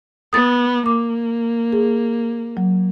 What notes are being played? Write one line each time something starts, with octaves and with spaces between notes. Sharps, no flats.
B3 D#6 A6
A#3 D6
G#4
F#3